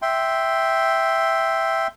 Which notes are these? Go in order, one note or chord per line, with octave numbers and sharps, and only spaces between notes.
E5 G5 C6